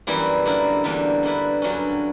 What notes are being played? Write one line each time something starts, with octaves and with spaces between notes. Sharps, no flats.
F#2 E3 G3 A#3 E4
D3 A#3 E4 A#4
E2 D3 G3 A#3
D3 A#3 E4 B4
G2 D3 F#3 C#4